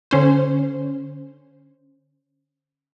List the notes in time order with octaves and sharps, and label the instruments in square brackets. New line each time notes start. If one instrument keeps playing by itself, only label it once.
[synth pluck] D3 C#4 C5